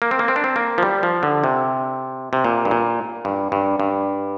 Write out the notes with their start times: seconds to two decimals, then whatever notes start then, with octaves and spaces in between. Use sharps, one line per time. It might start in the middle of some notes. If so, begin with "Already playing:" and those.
0.02 A#3
0.11 C4
0.19 A#3
0.28 C4
0.36 D4
0.44 C4
0.56 A#3
0.78 F3
0.83 G3
1.03 F3
1.23 D3
1.44 C3
2.33 C3
2.44 A#2
2.65 G2
2.71 A#2
3.25 G2
3.52 G2
3.80 G2